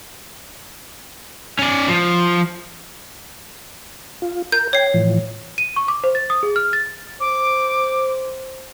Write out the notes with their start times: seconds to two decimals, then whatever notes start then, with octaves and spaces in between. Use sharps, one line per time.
1.59 C#4 D5
1.88 F3
4.22 F4
4.52 A#4 G6
4.73 C#5 G5 C7
4.94 A2 E3 F3
5.58 D#7
5.76 C#6
5.88 D6
6.04 C5
6.15 A6
6.30 D#6
6.43 G#4
6.56 F6
6.73 A6
7.20 C5 D6